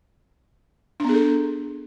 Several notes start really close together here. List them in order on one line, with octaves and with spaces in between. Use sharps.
D4 B3 G#4 A4